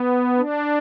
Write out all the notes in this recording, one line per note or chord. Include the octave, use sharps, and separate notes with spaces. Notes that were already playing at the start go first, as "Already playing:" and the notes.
Already playing: B3
D4